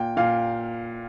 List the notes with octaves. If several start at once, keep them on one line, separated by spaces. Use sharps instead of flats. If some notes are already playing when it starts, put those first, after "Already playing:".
Already playing: A#2 G5
A#2 F5